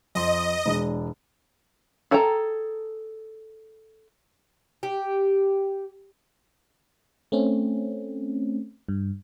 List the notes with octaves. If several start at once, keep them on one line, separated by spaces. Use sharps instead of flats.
F2 D#5 C6
E1 G#3 D4
G#4 A4 G5 A5 A#5
G4
A3 C4 C#4
G2